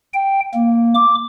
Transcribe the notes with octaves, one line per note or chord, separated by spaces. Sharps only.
G5
A#3
D6